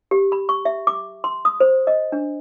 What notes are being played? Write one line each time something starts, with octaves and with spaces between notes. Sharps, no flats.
G4
B5
C#6
E5
D6
C6
D#6
C5
D#5
D4